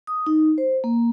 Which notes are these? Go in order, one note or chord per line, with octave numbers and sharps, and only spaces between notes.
D#6
D#4
C5
A#3